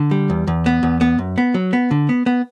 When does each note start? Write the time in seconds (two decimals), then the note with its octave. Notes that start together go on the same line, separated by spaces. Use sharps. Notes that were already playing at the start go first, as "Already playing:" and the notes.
Already playing: D3
0.11 G3
0.30 E2
0.47 E2
0.66 B3
0.83 E2
1.01 B3
1.19 F#2
1.38 B3
1.54 F#3
1.73 B3
1.91 D3
2.09 B3
2.26 B3